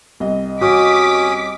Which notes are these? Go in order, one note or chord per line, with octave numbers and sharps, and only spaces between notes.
C2 D#5
C#4 F#4 D6 D#6 B6